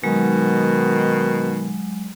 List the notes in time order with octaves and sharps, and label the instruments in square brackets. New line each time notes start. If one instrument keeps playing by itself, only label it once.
[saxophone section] B2 D#3 [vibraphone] F#3 G#3